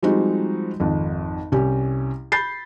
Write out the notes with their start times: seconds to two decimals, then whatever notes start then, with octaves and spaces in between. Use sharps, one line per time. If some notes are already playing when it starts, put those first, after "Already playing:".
0.03 F3 G3 G#3 C4 D#4 F#4
0.80 G#1 F2
1.52 C2 C#4 G4
2.32 B5 G6 A6 C7